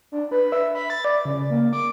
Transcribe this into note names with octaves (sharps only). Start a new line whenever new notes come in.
D4
B4
E5
B5
A6
D5
C#3
A#3
D6